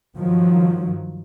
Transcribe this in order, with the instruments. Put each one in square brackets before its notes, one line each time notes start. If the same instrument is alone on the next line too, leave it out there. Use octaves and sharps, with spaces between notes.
[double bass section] G2 D#3 F3 F#3